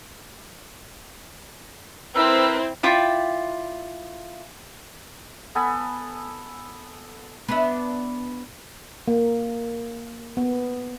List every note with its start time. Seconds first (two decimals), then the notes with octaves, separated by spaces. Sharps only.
2.15 C4 E4 A#4 B4 E6
2.83 E4 F4 D5 G5
5.55 B3 A4 G#5 B5
7.48 B3 D4 E5
9.08 A#3
10.37 B3